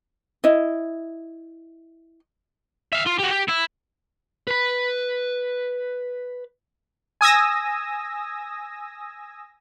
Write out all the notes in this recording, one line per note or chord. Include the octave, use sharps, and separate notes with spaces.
E4 D#5
E5 F5
F4
F#4 G4
G4
E4
B4 B5
G#5 D#6 E6 A#6